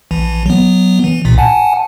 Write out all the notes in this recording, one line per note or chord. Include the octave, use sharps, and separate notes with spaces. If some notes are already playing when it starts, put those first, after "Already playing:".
A#1 E3
F#3 B3
E3
B1 A#2
F#5 G#5 A5